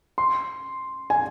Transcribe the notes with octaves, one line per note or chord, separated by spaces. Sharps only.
C6
G#5